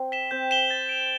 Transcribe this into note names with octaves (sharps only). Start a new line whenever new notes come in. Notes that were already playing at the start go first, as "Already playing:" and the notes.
Already playing: C4
B6 E7 G7
C4 G6
B6 E7 G7
A6
D7 F7